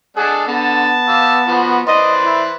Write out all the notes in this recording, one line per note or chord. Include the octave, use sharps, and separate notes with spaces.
G#3 D4 G#4 A4 F#5
D3 B3 A5
G4 F5 E6
F3 F#4 B4
E3 B4 C5 D5 D#5
E4